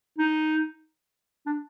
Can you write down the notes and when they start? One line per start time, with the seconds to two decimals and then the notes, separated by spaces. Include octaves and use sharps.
0.18 D#4
1.46 D4